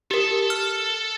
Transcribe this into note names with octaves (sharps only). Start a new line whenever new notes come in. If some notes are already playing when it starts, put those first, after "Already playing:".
G4 A4 A#4 A5
F6